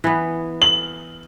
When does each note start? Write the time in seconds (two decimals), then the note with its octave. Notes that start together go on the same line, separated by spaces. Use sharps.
0.04 E3 B3
0.62 F#7